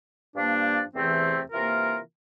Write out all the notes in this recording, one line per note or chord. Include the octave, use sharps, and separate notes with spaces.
G2 F3 A#3 D4
E2 C3 E3 A3 C4
C3 E3 A#3 F4 A#4